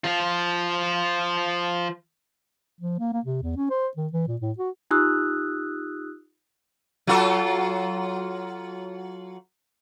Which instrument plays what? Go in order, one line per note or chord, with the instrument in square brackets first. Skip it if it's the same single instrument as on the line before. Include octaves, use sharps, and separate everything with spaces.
[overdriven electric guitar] F3 F4
[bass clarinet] F3
A#3
A#3
C3
E2
C#4
C5
D#3
E3
A#2
A2
F#4
[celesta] D#4 F4 G4 D#6 E6 F#6
[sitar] F#3 F4 A4